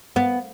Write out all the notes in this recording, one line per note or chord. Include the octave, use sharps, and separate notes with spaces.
B3